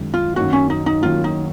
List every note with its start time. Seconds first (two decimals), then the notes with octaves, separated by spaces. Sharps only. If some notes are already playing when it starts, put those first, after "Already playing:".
Already playing: F#2 D#3 G#3
0.14 F4
0.36 F#2 D#3 F#3 A#3 F#4
0.53 C#4
0.70 D#4
0.86 D#4
1.02 F#2 D#3 F#3 A#3 F4
1.24 D#4